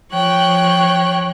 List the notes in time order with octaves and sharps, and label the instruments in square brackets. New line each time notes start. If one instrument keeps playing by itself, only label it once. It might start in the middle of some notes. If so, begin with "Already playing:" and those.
[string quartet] F3 C#5 G5 F#6